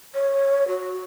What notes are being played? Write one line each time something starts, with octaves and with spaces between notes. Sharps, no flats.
C#5
F#4